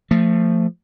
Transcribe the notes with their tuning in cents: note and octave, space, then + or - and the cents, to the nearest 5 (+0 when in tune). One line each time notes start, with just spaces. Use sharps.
F3 +0 A3 +25